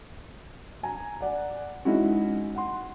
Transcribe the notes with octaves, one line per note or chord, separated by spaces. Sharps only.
G#5 A#5
D5 F#5
G#3 C#4 D#4 E4 F#4
F#5 C6